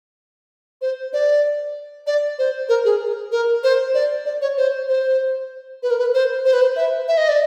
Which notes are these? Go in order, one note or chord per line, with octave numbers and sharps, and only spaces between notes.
C5
D5
D5
C5
A#4
G#4
A#4
C5
D5
D5
C#5
C5
C5
B4
A#4
B4
C5
C5
B4
C5
E5
E5
D#5
D5